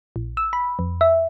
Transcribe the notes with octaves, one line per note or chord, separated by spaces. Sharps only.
A#1
E6
B5
F2
E5